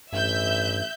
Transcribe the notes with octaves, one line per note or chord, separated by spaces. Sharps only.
A1 G2 E5 G6